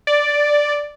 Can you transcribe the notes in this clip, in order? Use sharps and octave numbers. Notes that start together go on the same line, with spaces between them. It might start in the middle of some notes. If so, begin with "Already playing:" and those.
D5